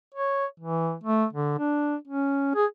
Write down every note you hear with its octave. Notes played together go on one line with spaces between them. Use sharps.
C#5
E3
A3
D3
D4
C#4
G#4